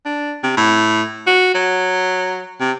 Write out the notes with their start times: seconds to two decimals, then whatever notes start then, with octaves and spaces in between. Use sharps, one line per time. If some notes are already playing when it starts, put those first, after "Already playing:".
0.05 D4
0.43 C3
0.57 A2
1.27 F#4
1.54 F#3
2.60 C3